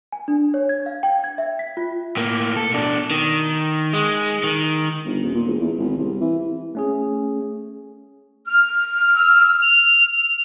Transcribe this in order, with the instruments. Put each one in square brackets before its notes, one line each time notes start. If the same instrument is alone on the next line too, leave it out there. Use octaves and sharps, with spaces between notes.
[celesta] G#5
D4
C#5
G#6
F5
G5
G#6
E5
B6
F4
[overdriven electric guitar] A2 A#3
A4
B2 D4
D#3
G#3
D#3
[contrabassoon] G1
D#1
A#2
E1
E2
G#1
C2
E3
[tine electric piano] A3 C#4 G#4
[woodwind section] F6
[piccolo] E6
F7